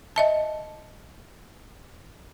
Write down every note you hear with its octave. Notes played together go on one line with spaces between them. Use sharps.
D#5 E5 A5